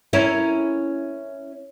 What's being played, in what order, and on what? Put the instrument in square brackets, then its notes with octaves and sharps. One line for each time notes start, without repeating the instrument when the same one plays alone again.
[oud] C#4 E4 A#4